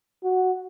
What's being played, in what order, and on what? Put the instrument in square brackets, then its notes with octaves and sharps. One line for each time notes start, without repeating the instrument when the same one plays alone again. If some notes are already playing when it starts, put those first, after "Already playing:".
[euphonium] F#4